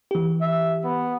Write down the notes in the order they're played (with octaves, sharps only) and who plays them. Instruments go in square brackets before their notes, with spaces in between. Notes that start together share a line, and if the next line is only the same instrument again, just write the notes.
[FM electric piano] E3 G4
[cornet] E5
B3